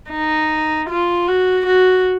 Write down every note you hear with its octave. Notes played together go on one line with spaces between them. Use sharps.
D#4
F4
F#4
F#4